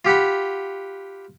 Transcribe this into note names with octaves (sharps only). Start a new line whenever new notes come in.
F4 G4 F#5 B5